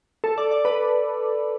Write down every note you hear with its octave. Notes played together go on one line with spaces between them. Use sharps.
A4
D5
D5
B4